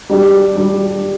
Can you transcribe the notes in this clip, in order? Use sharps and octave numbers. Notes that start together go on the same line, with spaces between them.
G3 D4 G4
G3 D4 G4